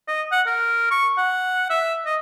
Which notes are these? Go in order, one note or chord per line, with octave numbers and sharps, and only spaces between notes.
D#5
F#5
A#4
C#6
F#5
E5
D#5